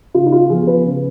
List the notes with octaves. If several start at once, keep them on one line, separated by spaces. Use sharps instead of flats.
C#3 F4
D#4
F4
F3 B3 G#4
B4
C#3